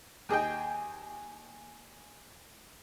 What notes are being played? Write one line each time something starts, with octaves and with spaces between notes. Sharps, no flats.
D#2 G#4 D#5 G5